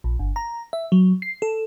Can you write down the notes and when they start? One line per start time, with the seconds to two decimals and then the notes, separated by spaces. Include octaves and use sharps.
0.04 A#1
0.19 G1
0.36 A#5
0.73 E5
0.92 F#3
1.22 C7
1.42 A4